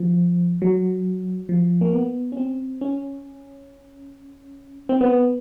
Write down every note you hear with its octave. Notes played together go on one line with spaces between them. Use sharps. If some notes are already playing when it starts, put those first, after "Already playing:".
Already playing: F3
F#3
F3
A#3
B3
C#4
C4
C#4
C4
B3